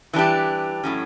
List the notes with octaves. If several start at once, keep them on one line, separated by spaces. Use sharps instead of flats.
E3 G3 D4 G4
A2 F#3 C#4